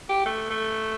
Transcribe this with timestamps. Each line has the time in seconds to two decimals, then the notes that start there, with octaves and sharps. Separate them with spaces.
0.09 G4
0.26 A3
0.50 A3